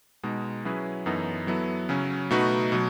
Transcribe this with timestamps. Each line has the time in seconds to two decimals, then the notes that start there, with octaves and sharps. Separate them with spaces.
0.23 B2 G#3 D#4
0.65 F#3 C#4 E4 G#4 B4
1.06 F#2 E3 B3 D#4 A4
1.47 F#3 B3 E4 A4
1.89 C#3 F#3 C#4
2.31 B2 A3 D#4 F#4 B4
2.72 B2 F#3